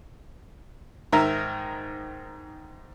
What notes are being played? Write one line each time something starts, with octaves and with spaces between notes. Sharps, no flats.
G#2 D#3 A#4 E5 A#5